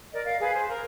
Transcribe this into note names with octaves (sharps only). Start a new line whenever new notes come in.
A#4 D5 D#5
F5
G#4 B4 F5
C5
A#4